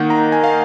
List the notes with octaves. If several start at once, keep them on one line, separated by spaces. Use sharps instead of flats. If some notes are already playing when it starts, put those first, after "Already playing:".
Already playing: D#3 A#3 D#4 F#5
A#5
G#5
F5